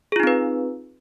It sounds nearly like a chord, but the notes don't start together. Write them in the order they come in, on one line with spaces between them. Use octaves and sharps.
G#4 F4 D#4 C4 B4